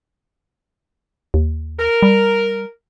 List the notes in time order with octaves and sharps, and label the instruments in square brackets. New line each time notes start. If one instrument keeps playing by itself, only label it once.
[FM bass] D#2
[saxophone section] A#4
[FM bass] G3